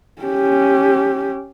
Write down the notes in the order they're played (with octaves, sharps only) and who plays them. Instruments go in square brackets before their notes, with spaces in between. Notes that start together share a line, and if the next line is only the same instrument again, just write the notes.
[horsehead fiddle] C#4 G4